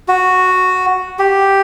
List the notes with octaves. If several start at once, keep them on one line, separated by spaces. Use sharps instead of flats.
F#4
G4